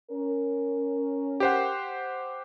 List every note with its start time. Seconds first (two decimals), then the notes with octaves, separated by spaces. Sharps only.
0.11 C#4 A#4
1.40 G4 C5 F#5